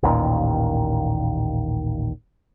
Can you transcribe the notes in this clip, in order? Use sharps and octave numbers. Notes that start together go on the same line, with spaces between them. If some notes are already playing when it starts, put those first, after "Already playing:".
A1 D#2 A#2 D#3